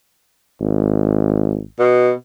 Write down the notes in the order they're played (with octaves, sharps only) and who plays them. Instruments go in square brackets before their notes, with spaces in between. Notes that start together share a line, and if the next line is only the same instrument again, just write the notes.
[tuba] G#1
[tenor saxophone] B2